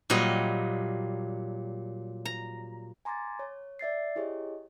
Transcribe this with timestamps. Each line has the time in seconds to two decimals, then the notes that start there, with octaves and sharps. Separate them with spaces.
0.10 A#2 F#3 G3 D#5
2.25 A#5
3.05 G#5 A#5 C6 D6 G#6 A6
3.39 C#5
3.79 D5 E5 A6 C7
4.16 E4 G4 G#4 C#5 D#5